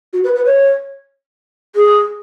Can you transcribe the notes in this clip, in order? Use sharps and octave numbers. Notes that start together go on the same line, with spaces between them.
F#4
B4
B4
C#5
G#4